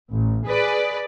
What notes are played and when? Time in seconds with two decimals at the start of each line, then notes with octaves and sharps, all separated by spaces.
0.12 A1
0.46 G#4 B4 D5